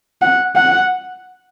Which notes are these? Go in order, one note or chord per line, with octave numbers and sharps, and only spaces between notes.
F#5
F#5